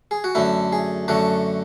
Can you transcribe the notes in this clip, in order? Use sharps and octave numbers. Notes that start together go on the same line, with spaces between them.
G#4
F#4
F#2 D3 A3 E4
G#4
F#2 D3 A3 F#4